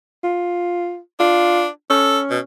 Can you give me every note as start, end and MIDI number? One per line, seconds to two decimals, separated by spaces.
0.24 0.99 65
1.20 1.68 62
1.20 1.65 65
1.90 2.41 61
1.90 2.19 69
2.30 2.39 47